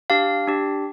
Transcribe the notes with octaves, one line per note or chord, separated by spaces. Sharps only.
D4 G4 F5
D4 G4